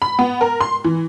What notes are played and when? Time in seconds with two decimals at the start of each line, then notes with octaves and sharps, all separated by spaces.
0.02 B5
0.19 B3
0.41 A#4
0.61 C6
0.84 E3